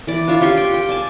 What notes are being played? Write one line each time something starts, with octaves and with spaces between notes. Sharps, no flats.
E3 D5
D4 F4 C#5 E5
F4 G4 C6 C#6
G5
G5
D5 G#5 A5